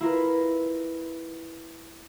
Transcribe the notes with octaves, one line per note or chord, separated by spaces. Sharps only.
E4 F4 A#4 B4